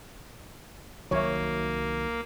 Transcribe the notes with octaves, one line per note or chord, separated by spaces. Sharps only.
C2 D#3 F#3 A#3 C#5 E5